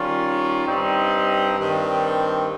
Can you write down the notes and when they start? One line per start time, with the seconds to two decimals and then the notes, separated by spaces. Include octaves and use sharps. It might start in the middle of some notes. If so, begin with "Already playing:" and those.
Already playing: D#3 G3 C#4 F4
0.66 G2 G3 C4 D#4
1.57 G2 D#3 G3 C4